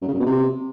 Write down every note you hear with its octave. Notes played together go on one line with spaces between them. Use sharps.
F#2
C#3
F#2
B2
C3